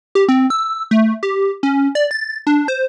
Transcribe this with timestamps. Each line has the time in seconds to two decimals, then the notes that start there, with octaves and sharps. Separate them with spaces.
0.15 G4
0.29 C4
0.50 E6
0.91 A3
1.23 G4
1.63 C#4
1.95 D5
2.11 A6
2.47 D4
2.68 C5